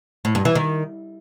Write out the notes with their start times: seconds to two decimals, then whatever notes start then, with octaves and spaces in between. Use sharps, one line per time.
0.25 A2
0.35 G2
0.45 E3
0.55 D#3